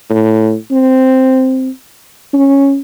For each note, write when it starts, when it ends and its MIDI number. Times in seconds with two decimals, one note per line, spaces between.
0.10 0.56 45
0.71 1.70 60
2.34 2.81 61